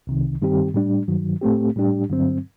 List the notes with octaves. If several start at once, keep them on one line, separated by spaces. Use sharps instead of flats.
C2 C3 D#3
G2 D#3 G3 C4 G4
A2 G3 D4
G2 D#3 F#3
A2 A3 C4 G4
A2 G3 D4 G4
G2 D3 F#3 C4